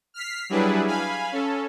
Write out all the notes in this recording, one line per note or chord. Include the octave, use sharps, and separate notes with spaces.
F6 B6 C7
F#3 G3 D4 E4 G#4 B4
F5 G#5 B5
C#4 A4